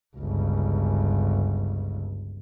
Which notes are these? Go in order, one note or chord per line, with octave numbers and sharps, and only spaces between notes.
G1 C#2